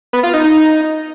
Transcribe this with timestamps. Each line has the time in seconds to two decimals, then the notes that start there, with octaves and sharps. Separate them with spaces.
0.13 B3
0.23 F4
0.34 D#4
0.44 D#4